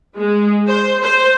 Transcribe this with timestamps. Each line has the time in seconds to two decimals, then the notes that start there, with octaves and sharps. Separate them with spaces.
0.16 G#3
0.68 C5
1.03 C5